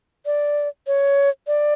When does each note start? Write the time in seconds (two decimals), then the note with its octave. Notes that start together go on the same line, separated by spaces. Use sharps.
0.26 D5
0.87 C#5
1.47 D5